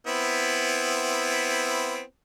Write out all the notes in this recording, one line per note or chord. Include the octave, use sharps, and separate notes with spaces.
B3 C4 E4